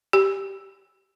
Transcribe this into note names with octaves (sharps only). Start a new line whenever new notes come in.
G4